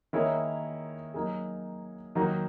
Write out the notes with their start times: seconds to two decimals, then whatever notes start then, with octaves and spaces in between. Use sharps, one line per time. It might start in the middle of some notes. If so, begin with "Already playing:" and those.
0.13 D#3 A#3 E4 G#4 C#5
1.14 F#3 A#3 D#4 G#4
2.15 D#3 F#3 A#3 D#4 F#4